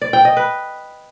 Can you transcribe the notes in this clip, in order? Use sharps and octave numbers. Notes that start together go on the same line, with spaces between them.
D5
G5
D#5
B4